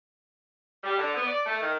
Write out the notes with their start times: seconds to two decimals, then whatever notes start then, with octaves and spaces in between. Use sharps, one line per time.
0.84 G3
0.98 D3
1.14 B3
1.27 D5
1.46 A3
1.61 D#3